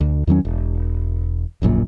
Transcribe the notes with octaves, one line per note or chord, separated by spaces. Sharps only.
D2
E2 D#3 F#3 C#4
E1
D1 A#1 F#2 A#2